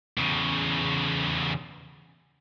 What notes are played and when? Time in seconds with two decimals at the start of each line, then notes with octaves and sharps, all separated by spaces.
0.17 E2 C#3